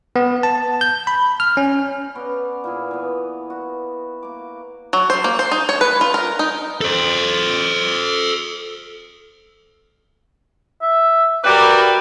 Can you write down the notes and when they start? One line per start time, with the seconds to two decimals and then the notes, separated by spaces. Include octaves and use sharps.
0.16 B3
0.43 A5
0.81 G6
1.07 B5
1.40 F6
1.57 C#4
2.15 B3 F#4 D5
2.64 A#2 E4 G#4
2.91 E3 B3
3.50 F#4
4.22 A#3 D6
4.93 F#3
5.10 C5
5.24 A#3
5.39 C5
5.52 D#4
5.69 C#5
5.81 B4
6.01 F4
6.14 A#4
6.39 D#4
6.81 A4 C5
10.82 E5
11.44 G3 F#4 A#4 B4 D6